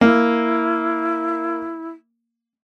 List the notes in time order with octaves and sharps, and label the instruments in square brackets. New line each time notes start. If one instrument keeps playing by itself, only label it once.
[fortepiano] A#3 [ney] E4